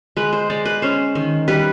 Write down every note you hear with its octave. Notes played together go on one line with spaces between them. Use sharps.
G#3 B4
C5
G#3 D5
B4
C#4 C5
D#3
G3 B4